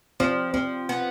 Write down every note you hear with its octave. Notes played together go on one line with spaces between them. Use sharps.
F3 C4
F3 C4
B3